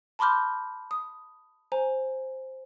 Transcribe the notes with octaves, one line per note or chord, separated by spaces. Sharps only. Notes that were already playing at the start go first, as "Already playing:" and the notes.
A5 B5 C6 D6 F6 G6
D#6
C5 G#5 A#5